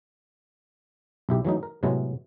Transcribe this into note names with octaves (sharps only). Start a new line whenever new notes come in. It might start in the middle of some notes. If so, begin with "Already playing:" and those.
B1 E4 G4
E3 F#3 A3 D#4
A#4
A2 C3 F#3 G#3 A3 B3